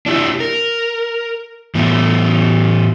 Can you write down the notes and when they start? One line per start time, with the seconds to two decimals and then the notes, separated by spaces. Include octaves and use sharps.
0.06 D4 E4 G4
0.40 A#4
1.75 A2 E3 B3